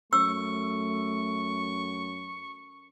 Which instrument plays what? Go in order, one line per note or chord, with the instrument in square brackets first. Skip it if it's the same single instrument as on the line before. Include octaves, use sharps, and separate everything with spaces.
[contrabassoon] F#2 [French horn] A3 [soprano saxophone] C#6 [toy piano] E6